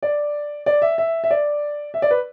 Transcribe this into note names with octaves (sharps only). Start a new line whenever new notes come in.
D5
D5
E5
E5
E5
D5
E5
D5
B4